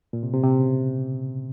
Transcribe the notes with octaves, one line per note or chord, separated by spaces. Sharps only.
A#2
C3
C3
C3
C#3